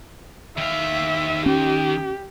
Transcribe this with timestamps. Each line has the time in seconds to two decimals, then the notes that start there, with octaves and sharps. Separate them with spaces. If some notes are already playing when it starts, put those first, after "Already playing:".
0.58 D#3 E5 F5
1.46 C#4 G4